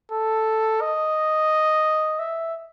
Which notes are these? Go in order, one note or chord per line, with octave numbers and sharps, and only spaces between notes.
A4
D#5
E5